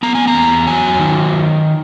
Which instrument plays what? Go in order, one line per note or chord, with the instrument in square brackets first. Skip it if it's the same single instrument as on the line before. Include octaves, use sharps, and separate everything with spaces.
[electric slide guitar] B3 A#5
G#5
A#5
E2
F#3 G#5
D#3